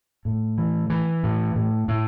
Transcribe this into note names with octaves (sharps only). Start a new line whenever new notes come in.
A2
E3
E3
A2
A2
A2